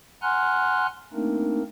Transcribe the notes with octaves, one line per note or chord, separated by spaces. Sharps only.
F#5 G#5 A#5 C6 F6 F#6
A3 A#3 C4 D4 D#4 A#4